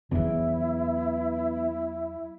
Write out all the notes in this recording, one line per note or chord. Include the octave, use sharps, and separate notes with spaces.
E2 E3 F#3 B3 E4